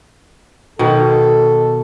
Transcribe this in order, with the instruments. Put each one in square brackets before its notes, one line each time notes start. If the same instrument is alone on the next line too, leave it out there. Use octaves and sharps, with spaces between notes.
[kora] B2 D#3 [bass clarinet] A4